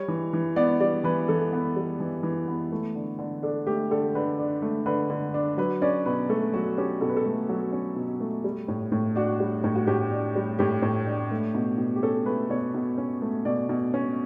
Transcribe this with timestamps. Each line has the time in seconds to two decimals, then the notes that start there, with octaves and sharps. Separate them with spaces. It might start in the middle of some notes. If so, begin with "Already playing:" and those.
Already playing: G3 C#5
0.08 E3
0.33 E3
0.56 B3 D5
0.80 G3 D5
1.04 E3 B4
1.28 E3 A4
1.53 B3
1.76 G3
2.00 E3
2.23 E3
2.48 B3
2.72 A3
2.95 D3
3.19 D3
3.43 D4 A4
3.67 A3 G4
3.91 D3 A4
4.15 D3 B4
4.39 D4
4.62 A3
4.86 D3 B4
5.10 D3
5.34 D4
5.57 F#3 B4
5.82 C#4 D5
6.06 B2 B4
6.29 A3 A4
6.53 F#3 F#4
6.78 C#4 G4
7.01 B2 A4
7.09 B4
7.17 A4
7.26 A3
7.49 F#3
7.73 C#4
7.96 B2
8.20 A3
8.44 G3
8.68 A2
8.92 A2
9.16 D4 F#4
9.40 G3
9.64 A2
9.75 F#4
9.87 A2 G4
10.11 D4
10.35 G3
10.59 A2 G4
10.83 A2
11.07 D4
11.31 A3
11.55 B2
11.78 B2
11.96 G4
12.03 C#4 A4
12.26 A3 B4
12.50 B2 C#5
12.74 B2
12.98 C#4
13.22 A3
13.45 B2 D5
13.69 B2
13.94 C#4